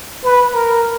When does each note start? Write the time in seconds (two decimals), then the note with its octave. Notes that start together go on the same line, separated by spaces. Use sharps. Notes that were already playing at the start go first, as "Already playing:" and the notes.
0.24 B4
0.54 A#4